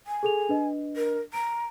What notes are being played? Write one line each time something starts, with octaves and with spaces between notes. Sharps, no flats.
G#5
G#4 A4 F7
D4 B4 D#5
A#4
A#5 D7